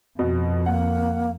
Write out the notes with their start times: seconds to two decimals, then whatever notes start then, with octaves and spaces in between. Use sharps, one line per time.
0.19 F2 B2
0.66 A#3 F#5